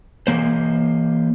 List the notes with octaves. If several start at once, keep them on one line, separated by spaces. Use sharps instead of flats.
E3 A#3 C5